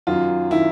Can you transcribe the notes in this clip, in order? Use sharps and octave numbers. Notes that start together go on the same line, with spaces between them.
F#2 D#3 F4
D#3 E4